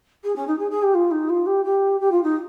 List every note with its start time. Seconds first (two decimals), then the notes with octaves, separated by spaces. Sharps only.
0.23 G#4
0.35 C#4
0.47 D#4
0.58 G#4
0.70 G#4
0.82 G4
0.94 F4
1.11 D#4
1.29 F4
1.46 G4
1.64 G4
2.00 G4
2.11 F4
2.23 D#4